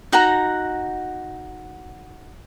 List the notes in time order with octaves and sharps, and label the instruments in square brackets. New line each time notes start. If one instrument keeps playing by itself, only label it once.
[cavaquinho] D#4 F#4 F#5 A#5